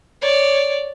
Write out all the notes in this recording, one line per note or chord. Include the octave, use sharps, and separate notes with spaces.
C#5 D5